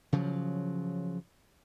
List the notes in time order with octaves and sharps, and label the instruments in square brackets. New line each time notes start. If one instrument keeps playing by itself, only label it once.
[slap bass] C#3 F3 F#3